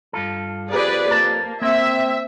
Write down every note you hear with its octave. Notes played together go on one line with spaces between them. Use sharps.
G2 F4 A4
F2 G4 G#4 B4 D5
A#3 A5
A#3 C4 E5